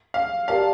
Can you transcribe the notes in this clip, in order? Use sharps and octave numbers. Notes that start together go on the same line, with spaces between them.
F5
G4 A#4 D5 F5 A5